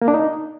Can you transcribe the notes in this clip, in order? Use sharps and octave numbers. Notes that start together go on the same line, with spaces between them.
A#3
D4
D#4